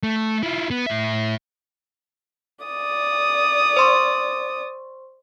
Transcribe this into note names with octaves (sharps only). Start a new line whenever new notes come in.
A3
E4 F4
B3
A2 E5
D5 D#6
C5 C6 C#6